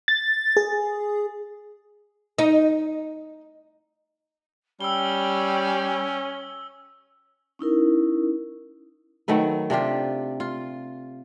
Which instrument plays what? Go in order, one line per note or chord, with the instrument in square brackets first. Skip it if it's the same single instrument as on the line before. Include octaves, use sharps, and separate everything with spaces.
[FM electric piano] A6
G#4
[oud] D#4
[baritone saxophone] G3 [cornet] C#4 [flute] G5 [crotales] E6 G7
[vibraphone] C#4 D#4 E4 A#4
[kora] D#3 F#3 A3 B4
C3 D4 F4 G4
F4